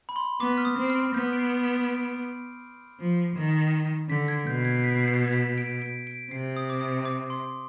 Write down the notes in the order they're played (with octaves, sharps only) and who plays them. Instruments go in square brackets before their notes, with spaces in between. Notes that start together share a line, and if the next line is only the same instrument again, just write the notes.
[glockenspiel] B5
C6
[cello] B3 [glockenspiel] D6
[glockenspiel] F6
D#6
[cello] C4
[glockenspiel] F6
[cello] B3 [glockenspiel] G6
[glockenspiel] D7
C7
D7
D7
[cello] F3
D#3
[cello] D3 [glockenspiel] B6
[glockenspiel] G#6
[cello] B2 [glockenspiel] G6
[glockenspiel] G#6
B6
C7
G#6
B6
D7
D7
D7
[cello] C3 [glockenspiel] C7
[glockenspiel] D#6
D6
D#6
D6
C6